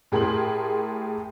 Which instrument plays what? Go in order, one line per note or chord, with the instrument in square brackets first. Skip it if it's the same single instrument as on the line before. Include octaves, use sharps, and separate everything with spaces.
[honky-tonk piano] A2 G4 G#4 A#4 C6 F#7